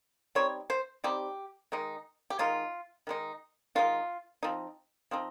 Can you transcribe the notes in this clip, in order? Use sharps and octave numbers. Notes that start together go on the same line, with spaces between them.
G3 C4 D#4 C#5
C5
G3 C4 D#4 G4
D#3 G#3 D#4
G4
D#3 G#3 D#4 F4
D#3 G#3 D#4
D#3 G#3 D#4 F4
F3 C4 D#4
F3 C4 D#4